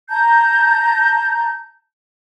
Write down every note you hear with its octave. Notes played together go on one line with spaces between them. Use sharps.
A5 A#5 G6